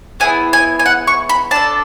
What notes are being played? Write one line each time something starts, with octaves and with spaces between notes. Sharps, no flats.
B3 E4 G#4 G#5
G#5
G#5
F#5
C#6
B5
D4 A4 A5